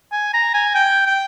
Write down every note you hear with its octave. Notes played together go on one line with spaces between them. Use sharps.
G#5
A#5
G#5
G5
G5